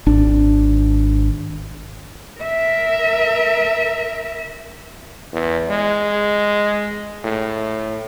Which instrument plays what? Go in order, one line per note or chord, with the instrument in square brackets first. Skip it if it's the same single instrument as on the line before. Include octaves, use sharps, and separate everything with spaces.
[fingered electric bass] G#1 D4
[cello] A#4 E5
[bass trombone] E2
G#3
A2